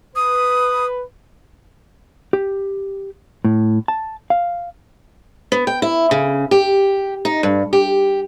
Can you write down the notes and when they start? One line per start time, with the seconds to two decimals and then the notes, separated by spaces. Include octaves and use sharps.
0.16 B4 D#6
2.33 G4
3.45 A2
3.88 A5
4.30 F5
5.52 B3
5.67 G5
5.82 E4
6.11 C#3
6.51 G4
7.25 D#4
7.43 G2
7.73 G4